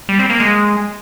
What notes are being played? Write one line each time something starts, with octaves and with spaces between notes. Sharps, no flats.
G3
C4
A#3
G#3